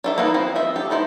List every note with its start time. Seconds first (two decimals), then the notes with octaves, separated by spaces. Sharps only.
0.04 D4 A4 E5
0.18 A#3 B3 D#4 E4 B4
0.34 F3 C4
0.55 F3 D#5 E5
0.76 G4 A4
0.90 B3 D#4 E4 C5